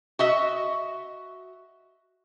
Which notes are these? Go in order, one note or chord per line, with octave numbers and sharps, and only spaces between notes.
F#4 D#5 E5